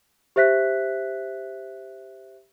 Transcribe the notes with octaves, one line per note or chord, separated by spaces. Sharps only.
G4 C5 E5 F#6 B6